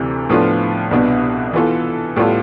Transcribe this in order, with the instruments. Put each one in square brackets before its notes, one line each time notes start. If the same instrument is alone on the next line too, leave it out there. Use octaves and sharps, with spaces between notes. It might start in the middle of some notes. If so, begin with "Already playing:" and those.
Already playing: [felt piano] D2 C3 E3
A2 F3 B3 D4 F4
C2 B2 B3 D4
E3 B3 F4 A4
A2 G3 B3 F4 A4